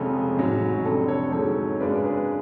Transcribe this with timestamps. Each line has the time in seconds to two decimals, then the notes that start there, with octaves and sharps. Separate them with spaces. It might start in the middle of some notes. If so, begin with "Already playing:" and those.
Already playing: F1 F2 C#3 G#3 C#4 A4
0.37 A1 G#2 F#3 C#4
0.84 F1 F2 D3 A4
1.08 A4 C#5
1.32 G#2 F#3 C#4 A4 C#5
1.80 F#2 C#3 G#3 D4 B4 D5
2.05 G#4 B4